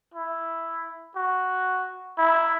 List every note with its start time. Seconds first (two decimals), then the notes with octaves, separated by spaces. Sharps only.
0.14 E4
1.16 F#4
2.18 E4